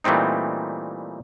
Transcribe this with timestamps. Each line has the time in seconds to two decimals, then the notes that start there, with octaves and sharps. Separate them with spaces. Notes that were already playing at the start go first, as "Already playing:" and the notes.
0.04 A#2 E3 G3 A3 C4 D#4